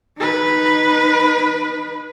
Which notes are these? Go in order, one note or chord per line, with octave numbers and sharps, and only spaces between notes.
D#4 B4